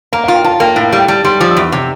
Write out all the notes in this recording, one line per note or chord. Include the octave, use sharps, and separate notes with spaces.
A#3 A#5
F4 F5
G5
F4 A5
A#3 G5
A2
G3 F5
G5
G3 A5
G3 C6
F3 D6
E6
E2
D6
C3 D6